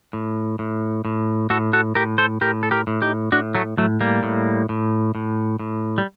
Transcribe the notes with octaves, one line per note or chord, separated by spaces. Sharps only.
A2
A2
A2
A2 F#4 A4
F#4 A4
A2 G4 A#4
A4 C5
A2 G4 A#4
A4
G4 A#4
A2
D#4 G4
A2 D4 F#4
F#3 A3
A2 F#3 A3
G3 A#3
A2
A2
A2
A2
G3